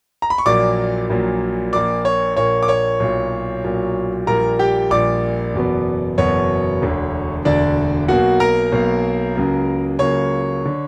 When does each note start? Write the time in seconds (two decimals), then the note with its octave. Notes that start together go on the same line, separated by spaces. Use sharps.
0.22 A#5
0.30 B5
0.38 C#6
0.46 A#1 A#2 F#3 A#3 D5 D6
1.10 A#1 A#2 F#3 A#3
1.73 A#1 A#2 A#3 D5 D6
2.05 C#5 C#6
2.37 A#1 A#2 A#3 C#5 C#6
2.63 D6
2.68 C#5 C#6
3.00 B1 A#2 F#3
3.64 B1 A#2 F#3
4.27 A#1 A#2 G3 A#3 A#4 A#5
4.59 G4 G5
4.90 A#1 A#2 G3 A#3 D5 D6
5.54 F#1 E2 B2 F#3 B3
6.18 F#1 E2 B2 F#3 B3 C#5 C#6
6.81 E1 D2 D3
7.45 E1 D2 D3 D4 D5
8.08 B1 B2 A#3 F#4 F#5
8.40 A#4 A#5
8.72 B1 B2 A#3
9.35 C#2 C#3 F#3 A#3
9.99 C#2 C#3 F#3 A#3 C#5 C#6
10.66 D3